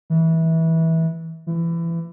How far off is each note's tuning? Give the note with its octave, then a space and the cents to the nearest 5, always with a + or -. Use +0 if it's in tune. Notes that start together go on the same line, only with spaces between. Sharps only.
E3 -20
E3 +25